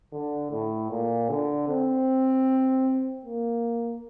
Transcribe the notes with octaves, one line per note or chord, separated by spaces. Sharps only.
D3
A2
A#2
D3
C4
A#3